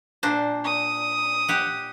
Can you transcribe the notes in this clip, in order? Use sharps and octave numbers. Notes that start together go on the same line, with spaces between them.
A#2 D4 C5
D#6
G4 F#5